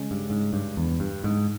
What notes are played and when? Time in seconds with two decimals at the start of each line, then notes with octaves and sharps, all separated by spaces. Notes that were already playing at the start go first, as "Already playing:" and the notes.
Already playing: C#3 G#3 C#4
0.11 G2
0.30 G#2
0.53 G2
0.77 E2
1.00 G2
1.24 G#2